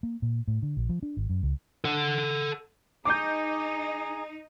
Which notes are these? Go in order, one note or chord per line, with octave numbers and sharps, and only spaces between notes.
A#3
A#2
A2
D3
A#1
F3
D4
G#1
F#2
C#2
A4 F#5
D#4 G#4 A#5 D6 G6